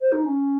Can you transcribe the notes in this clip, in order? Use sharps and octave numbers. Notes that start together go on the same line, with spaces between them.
C5
D#4
C#4